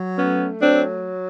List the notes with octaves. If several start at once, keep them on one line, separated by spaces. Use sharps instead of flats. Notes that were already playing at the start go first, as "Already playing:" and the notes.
Already playing: F#3
A3 B3 C#4
F#3 C4 D4